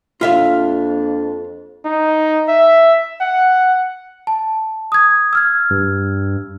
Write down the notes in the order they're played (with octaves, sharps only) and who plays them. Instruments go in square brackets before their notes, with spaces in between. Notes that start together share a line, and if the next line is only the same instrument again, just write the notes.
[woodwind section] F2 A#3 D4 [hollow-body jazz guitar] F4 E5 F5
[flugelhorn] D#4
E5
F#5
[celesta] A5
D#6 G#6
E6 F6 G#6
[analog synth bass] G2